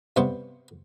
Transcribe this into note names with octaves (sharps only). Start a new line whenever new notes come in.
G2 C3 B3 C5 C#6